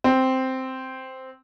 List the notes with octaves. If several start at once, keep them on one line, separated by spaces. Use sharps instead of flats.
C4